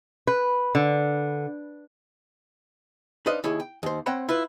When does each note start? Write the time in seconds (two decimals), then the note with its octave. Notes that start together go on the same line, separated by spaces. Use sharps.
0.27 B4
0.75 D3
3.26 D4 D#4 B4 C5 D#5 F5
3.44 D#2 E4 G#4 C#5
3.60 G5
3.83 D#2 C5
4.06 C4 C5 C#5 F#5 G5 B5
4.29 E4 F4 B4